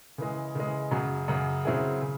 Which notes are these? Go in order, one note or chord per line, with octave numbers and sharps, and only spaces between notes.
C#3 E3 G#3
C#3 E3 G#3
F#2 C#3 F#3
F#2 C#3 F#3
C#3 F#3 C4 E4 G#4
C#3